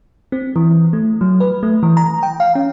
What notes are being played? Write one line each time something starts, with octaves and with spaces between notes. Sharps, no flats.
C4
E3
A3
F#3
B4
A3
E3
A#5
G5
F5
C#4